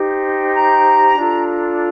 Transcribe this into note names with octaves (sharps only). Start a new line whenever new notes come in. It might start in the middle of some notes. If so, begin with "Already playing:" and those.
Already playing: D#4 G4 C5
A#5
D4 F4 A4